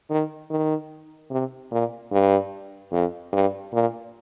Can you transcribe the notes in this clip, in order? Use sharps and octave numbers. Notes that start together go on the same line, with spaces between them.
D#3
D#3
C3
A#2
G2
F2
G2
A#2